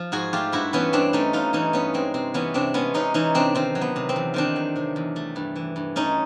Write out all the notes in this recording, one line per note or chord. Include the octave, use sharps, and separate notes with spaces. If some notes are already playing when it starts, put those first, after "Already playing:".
Already playing: F3
G#2 F#4 G#4
A3 F4 G4
G2 E4 F#4
E3 B3 C#4
G2 C4 D4
A3 C#4 D#4
G2 D#4 F4
E3 C#4 D#4
G2 B3 C#4
G#3 C4
C3 C4
E3 B3 C#4
C3 C4 D4
G#3 B3 C#4
C3 C#4 D#4
E3 C#4 D#4
C3 C4 D4
D#3 C4
F#3
B3
C3
C4
E2
D#3 C4 D4
F#3
C3
E2
A3
G2
E3
G2
A3 C#4 D#4